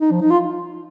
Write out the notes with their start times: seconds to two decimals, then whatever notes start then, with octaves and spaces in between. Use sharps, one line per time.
0.01 D#4
0.11 F3
0.21 D#4
0.30 F4